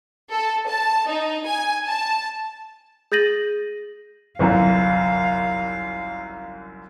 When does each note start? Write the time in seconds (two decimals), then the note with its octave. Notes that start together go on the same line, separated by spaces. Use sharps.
0.31 A4
0.67 A5
1.08 D#4
1.45 G#5
1.86 A5
3.12 G#4 G6 A6 A#6 D#7 F#7
4.39 G1 C2 F#2 F5